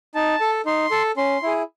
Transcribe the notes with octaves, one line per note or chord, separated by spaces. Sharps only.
D#4 A5
A4
D#4 C6
A4
C#4 C6
E4 G#4